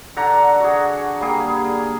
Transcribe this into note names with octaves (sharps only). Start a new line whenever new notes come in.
D3 F#5 A#5 D6
F#4 G#4
G3 A#3 G#4